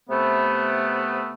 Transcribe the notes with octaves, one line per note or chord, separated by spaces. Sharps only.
C3 A3 B3